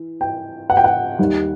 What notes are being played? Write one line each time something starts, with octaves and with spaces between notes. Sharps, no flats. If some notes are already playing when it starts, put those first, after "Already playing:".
Already playing: E3
G5
F#5
G5
F#5
D#2 D#3 G3